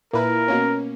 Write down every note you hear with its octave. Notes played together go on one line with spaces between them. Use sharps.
A#2 A#3 E4 A#4 B4
B2 A#3 C#4